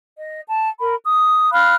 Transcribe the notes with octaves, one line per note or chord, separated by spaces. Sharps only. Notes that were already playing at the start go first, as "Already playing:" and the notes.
D#5
A5
A#4 B5
D#6
F5 B5 F6 F#6